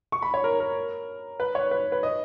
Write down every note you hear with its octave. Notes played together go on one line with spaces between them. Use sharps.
C#6
B5
C#5
A#4
A#4
B4
C#5
B4
B4
D#5